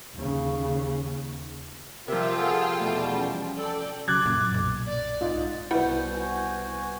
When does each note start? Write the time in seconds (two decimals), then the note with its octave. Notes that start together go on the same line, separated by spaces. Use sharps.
0.14 D#2 C#3
2.08 C3 F3 F4 A#4 E5 G5 A5
2.38 G#4 A4 F5 F#5
2.79 E2 B2 G3 A3
3.13 C#4
3.57 A4 D5 G5
4.08 C#3 F#3 D6 F#6 G#6 A6
4.26 F#2 A#2
4.54 B1
4.86 D5
5.21 G#2 F4 D#5
5.71 C2 B2 E4 B4 F#5 G6
6.14 F#4 G#5